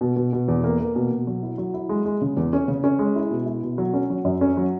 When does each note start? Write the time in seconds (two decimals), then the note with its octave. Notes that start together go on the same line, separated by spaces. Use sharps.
0.01 B2
0.16 B2
0.33 B2
0.48 E2
0.64 A#3
0.80 A#3
0.96 B2
1.11 B2
1.27 F#3
1.43 E4
1.58 F#3
1.74 E4
1.89 G#3
2.05 G#3
2.21 C#3
2.37 E2
2.53 C#4
2.68 C#3
2.84 C#4
2.99 G#3
3.16 E4
3.31 B2
3.46 E4
3.63 B2
3.78 F#3
3.94 C#4
4.10 F#3
4.25 F#2
4.41 C#4
4.57 F#3